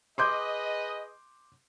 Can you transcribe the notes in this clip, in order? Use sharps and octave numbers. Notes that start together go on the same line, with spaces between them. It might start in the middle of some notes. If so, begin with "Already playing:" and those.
G#4 B4 D#5 C6 D6 G6